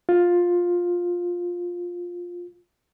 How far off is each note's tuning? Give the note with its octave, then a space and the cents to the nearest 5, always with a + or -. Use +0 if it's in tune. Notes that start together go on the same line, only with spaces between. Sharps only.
F4 +10